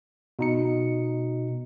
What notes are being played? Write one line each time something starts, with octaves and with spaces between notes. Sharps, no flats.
B2 D#4 C#7